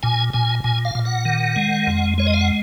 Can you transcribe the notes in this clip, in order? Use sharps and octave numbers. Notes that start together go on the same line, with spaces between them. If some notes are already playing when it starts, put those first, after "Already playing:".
A#2 G#5
A#2 G#5
A#2 G#5
F5
A#2
F#5
D#3
G#3
F2
G#3 C#5
D#5
F5
F#5